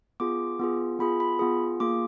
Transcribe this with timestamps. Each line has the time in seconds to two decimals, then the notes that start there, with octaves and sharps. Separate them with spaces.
0.20 B3 F4 G#4 D6
0.60 B3 F4 G#4
0.99 B3 F4 G#4 B5
1.20 B5
1.39 B3 F4 G#4
1.80 A#3 F4 G#4 D6